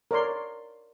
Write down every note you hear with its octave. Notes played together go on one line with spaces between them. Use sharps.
A#4 C#5 D5 C6